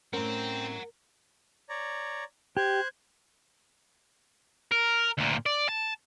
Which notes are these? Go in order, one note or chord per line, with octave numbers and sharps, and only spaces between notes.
A2 C4 C#4 A#4 F#5 A#5
C#5 D5 A#5
G4 C5 F#6 G#6
A#4
D2 A#2
D5
A5